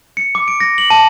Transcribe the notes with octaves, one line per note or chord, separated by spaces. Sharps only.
C#7
D6
D7
A#6
F#7
A5